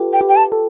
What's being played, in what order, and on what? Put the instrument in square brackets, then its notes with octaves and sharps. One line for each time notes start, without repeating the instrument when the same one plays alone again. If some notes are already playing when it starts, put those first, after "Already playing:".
Already playing: [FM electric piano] F4 G4 A4 B4
[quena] G5
[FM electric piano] G4
[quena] G5
A5
[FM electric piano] A4